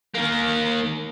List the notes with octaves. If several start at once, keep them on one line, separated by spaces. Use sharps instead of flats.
D#3 A#3